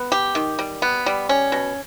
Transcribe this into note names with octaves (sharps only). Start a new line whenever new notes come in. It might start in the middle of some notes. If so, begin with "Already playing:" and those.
Already playing: B3
G4
D#3
G3
B3
G3
C#4
B2